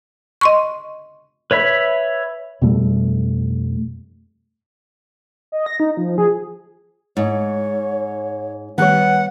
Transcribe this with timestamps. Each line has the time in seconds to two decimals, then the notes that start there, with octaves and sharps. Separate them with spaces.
0.41 D#5 C6 C#6
1.51 B4 C#5 E5 B5
2.62 F2 B2 G3 A3
5.52 D#5
5.66 A#6
5.80 D#4
5.97 F3
6.18 G#4
7.17 G#2 C#5
8.78 D#3 G3 B3 B4 C#5 F#5